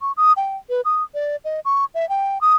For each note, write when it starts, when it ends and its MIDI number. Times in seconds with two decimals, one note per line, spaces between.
0.01 0.12 85
0.17 0.33 87
0.37 0.57 79
0.70 0.81 71
0.85 1.03 87
1.14 1.36 74
1.45 1.60 75
1.65 1.85 85
1.95 2.08 76
2.09 2.38 79
2.41 2.56 87